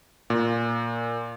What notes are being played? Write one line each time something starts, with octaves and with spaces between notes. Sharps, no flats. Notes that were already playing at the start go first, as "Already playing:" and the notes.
A#2